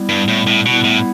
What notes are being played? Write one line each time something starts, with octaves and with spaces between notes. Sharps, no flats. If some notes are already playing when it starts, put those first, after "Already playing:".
Already playing: G3 B3 E4
G2
A2
A2
B2 G3 B3 E4
A2